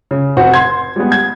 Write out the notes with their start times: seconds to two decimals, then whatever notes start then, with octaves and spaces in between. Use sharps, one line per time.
0.11 C#3
0.37 F1 C4 F#4 C5 F#5
0.54 C6 G#6
0.96 G3 G#3 B3
1.12 G#6